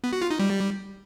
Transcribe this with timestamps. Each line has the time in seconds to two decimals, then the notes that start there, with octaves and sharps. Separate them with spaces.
0.04 B3
0.13 F#4
0.22 F4
0.30 D#4
0.39 G3